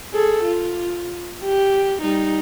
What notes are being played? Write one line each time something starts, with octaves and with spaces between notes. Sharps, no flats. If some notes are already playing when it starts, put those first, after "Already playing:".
G#4 A4
F4
G4
G3 D#4